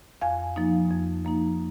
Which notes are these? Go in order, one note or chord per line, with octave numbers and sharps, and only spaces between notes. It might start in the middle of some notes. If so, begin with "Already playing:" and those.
F2 F5 G#5
F3 A#3 D#4
F2
F3 A#3 D#4